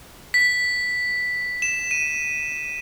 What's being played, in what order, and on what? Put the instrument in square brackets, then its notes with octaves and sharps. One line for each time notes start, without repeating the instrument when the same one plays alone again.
[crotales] B6
E7
D#7